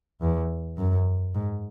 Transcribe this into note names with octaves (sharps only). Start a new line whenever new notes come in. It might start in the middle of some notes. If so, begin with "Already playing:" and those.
E2
F#2
G#2